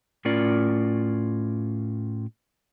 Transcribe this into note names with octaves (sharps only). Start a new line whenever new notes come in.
A2 C#4 F4 A#4 D5